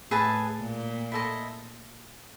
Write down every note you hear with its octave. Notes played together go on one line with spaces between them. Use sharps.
A2 G#4 B4 E5 A5
A#2
E4 A4 C5 D#5